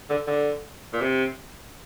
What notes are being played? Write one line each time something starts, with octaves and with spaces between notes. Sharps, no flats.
D3
D3
A#2
C3